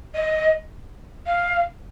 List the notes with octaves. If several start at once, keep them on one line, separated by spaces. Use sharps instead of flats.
D#5
F5